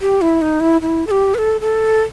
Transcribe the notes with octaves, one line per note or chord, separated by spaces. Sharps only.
G4
E4
D#4
E4
E4
A4
G4
B4
A4
A4